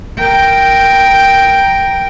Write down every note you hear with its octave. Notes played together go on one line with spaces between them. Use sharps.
A#4 G5